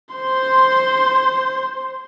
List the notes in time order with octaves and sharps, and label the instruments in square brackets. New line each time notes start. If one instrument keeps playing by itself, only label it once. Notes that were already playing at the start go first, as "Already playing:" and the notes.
[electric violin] C5 C6